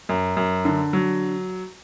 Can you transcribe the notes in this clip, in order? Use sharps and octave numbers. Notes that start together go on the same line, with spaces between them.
F#2
F#2
D3
F#3